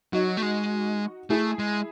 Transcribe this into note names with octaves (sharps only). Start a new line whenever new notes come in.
F#3 D#4 F#4
A3
G#3
A3 E4 G#4
G#3